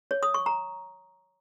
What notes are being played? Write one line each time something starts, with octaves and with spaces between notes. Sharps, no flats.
C#5
D#6
C#6
A#5